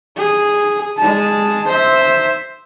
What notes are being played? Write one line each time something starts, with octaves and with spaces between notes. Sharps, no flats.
G#4
G#3 A5
C5 E5